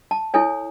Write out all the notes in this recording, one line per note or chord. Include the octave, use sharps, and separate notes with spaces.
A5
E4 A4 C#5 G#5